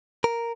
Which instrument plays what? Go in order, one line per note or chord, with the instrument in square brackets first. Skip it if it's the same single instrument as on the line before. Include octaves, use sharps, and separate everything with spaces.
[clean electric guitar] A#4